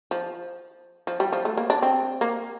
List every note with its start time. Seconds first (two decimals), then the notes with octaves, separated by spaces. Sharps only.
0.11 F3
1.07 F3
1.20 G3
1.33 F3
1.45 A3
1.57 A#3
1.70 D4
1.82 C4
2.21 A#3